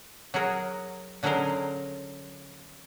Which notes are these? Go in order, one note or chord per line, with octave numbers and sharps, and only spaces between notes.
F#3 F#4 G#4 A#4
D3 F#3 C#4 G#4 A#4 C5